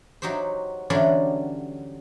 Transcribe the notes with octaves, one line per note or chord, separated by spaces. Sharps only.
F#3 D#4 F#4 G4 C5
D3 E3 F#3 G3 C#4 D4